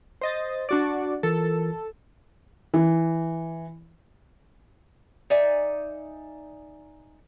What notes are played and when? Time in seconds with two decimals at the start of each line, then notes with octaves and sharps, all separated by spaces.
0.21 C5 D#5 A6
0.69 D4 F#4 D5
1.23 E3 F4 A4 A#4
2.74 E3
5.30 D#4 D5 E5 G#5